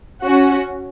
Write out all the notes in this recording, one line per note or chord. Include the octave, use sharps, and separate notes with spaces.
C#4 F#4